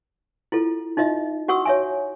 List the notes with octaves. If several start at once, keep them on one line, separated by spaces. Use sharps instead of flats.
E4 F4 A4
D#4 F4 D#5 E5
F#4 F#5 C#6 D#6 E6
C#5 E5 G#5